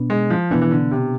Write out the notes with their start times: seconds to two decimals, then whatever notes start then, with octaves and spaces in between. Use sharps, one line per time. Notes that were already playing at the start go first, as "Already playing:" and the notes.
Already playing: B2 B3 D4
0.10 G#3
0.30 F3
0.51 B2 E3 B3 D4
0.61 E3
0.71 D3
0.91 C3